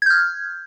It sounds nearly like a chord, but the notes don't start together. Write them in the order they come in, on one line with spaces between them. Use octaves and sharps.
G#6 G6 F6